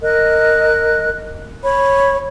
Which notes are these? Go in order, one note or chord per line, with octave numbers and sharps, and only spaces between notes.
A#4 D#5 F#6
C#5 B5